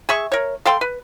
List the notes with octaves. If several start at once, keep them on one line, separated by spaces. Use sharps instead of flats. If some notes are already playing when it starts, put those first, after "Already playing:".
G#4 E5 C#6
A#4 C#5
A4 F5 G5 C6
B4